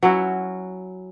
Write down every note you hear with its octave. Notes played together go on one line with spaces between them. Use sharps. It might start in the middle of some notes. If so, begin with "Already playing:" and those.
F#3 C#4 E4 F#4